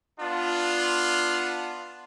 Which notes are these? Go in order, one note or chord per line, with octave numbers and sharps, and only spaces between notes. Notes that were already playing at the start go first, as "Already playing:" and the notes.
B3 D4 F4